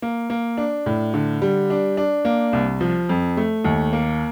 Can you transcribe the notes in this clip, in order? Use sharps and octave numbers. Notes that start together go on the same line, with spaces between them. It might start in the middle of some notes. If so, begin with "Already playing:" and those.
A#3
A#3
D4
A2
D3
G3
D4
D4
A#3
C2
F3
F2
A3
D#2
A#3